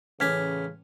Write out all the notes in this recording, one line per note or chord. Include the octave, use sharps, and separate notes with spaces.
A1 C#3 C#4 D6 F6 G#6 B6